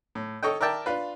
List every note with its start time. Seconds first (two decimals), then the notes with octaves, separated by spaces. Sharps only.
0.15 A2
0.43 A4 C#5 D#5 G5
0.61 A#4 D5 E5 G5 A5
0.86 D4 F4 B4